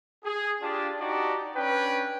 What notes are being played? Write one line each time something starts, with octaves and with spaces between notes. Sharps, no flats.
G#4
D4 F4 G4 D5 A5
D#4 F#4 G4 D5 A5
C#4 D4 B4 G5